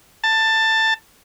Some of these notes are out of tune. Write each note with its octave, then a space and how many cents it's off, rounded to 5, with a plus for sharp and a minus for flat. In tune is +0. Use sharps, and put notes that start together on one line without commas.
A5 +15